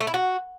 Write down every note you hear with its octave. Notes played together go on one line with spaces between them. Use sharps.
A3
E4
F#4